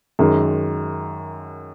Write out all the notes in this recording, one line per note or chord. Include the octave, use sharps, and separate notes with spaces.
F#2 D#3 G#3